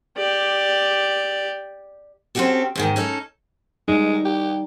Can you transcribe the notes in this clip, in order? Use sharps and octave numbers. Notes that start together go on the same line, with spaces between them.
G4 D5
C4 C#4 D#4 F#4 G4 A4
E2 G#2 D#3
C#4 D#4 A4
G3 G#3 D#4
G4